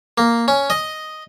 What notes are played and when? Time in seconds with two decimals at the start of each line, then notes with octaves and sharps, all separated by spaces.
0.18 A#3
0.48 C#4
0.70 D#5